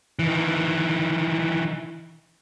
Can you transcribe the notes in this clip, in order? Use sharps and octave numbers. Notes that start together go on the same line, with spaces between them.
D#3 E3